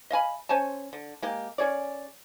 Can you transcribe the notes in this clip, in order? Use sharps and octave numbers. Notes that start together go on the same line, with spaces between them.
D#5 F5 G#5 B5
C#4 C5 G#5 A5
D3
G#3 A#3 G4
C#4 G#4 C#5 D5